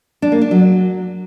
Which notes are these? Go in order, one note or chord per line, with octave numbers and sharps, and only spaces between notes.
D4
A#3
D4
F#3